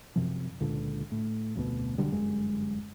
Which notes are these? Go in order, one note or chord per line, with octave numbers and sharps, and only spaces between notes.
F#2 C3 F3
C#2 A#2 D3
A2
F1 D2 B2
B1 D3 G3
G1 F#2 G#3